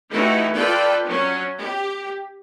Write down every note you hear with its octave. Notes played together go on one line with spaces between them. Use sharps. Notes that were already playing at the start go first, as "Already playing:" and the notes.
E3 A3 D#4 E4 F#4 G4
F4 A4 B4 D5 G5
F#3 C#4
G4